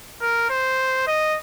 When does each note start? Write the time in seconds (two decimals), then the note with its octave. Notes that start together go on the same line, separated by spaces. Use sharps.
0.21 A#4
0.49 C5
1.08 D#5